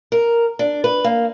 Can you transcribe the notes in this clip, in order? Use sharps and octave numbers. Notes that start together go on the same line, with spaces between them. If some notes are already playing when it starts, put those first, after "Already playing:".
A#4
D4
B4
A#3